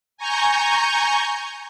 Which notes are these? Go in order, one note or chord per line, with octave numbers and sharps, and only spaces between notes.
G#5 A#5 C#6 G6